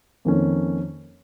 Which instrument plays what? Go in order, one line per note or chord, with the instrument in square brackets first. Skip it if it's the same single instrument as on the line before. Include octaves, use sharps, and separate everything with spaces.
[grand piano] F2 D#3 A#3 C#4